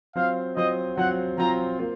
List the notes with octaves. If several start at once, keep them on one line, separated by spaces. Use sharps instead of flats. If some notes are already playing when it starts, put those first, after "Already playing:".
F#3 C4 F4 C5 F5
F#3 C4 F4 C5 D#5
F#3 C4 F4 C5 F#5
F#3 C4 F4 C5 A#5
A#3 F4 C5